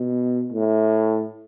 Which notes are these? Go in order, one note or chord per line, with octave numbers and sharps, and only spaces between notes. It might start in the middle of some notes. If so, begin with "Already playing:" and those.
Already playing: B2
A2